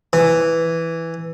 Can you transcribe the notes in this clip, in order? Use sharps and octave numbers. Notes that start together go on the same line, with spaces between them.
E3